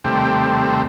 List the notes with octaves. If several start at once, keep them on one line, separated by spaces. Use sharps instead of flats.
D#2 C3 G3 A3 C4